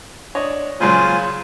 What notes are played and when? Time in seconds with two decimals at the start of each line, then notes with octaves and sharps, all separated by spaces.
0.35 D4 C#5 D#5
0.80 A#2 C#3 F#3 F4 C5 G#5